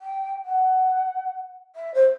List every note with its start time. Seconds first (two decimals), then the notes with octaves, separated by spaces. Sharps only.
0.01 G5
0.45 F#5
1.75 E5
1.94 C5